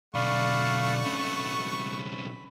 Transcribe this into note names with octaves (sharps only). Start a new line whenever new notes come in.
B1 D3 A3 D5 F5 F#5 B5 C#6
B1 C#3 B5